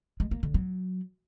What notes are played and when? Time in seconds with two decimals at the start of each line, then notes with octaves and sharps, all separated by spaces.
0.20 G#3
0.31 A#3
0.43 D3
0.54 F#3